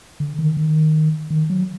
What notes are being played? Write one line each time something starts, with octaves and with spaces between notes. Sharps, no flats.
D3
D#3
D#3
D#3
F#3